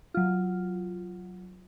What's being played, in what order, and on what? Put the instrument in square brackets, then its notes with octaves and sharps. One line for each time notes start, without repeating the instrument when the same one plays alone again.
[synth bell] F#3 F4